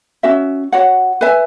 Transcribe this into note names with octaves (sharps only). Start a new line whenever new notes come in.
C#4 F#4 E5
F#4 C#5 F#5
B4 E5 G#5